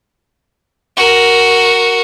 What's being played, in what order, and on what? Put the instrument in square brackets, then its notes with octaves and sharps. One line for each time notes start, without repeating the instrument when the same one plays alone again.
[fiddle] F#4 A#4